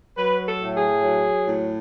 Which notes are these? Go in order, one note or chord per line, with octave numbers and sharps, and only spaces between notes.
F#3 B4
A4
A2
G#4
F#3
A2